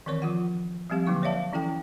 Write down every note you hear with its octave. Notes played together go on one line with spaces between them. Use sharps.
D#3 E3 C4 A#4 C#5 C#6
F3 F4 F#5
F3 G3 C4 G4 F5
D3 F#3 A#3 D#4 C#6
A#3 C#5 D5 E5 F5 A5
E3 C#4 E4 A4 G5